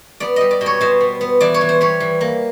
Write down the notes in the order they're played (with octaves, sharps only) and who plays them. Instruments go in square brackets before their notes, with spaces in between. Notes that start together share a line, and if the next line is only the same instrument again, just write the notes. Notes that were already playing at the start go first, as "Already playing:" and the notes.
[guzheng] B3 D5
G3 D#5
D5
B2
C#5
B2 C5
B3
B3
E3 D5
C#5
E3
C5
G3 C#5
E3
A#3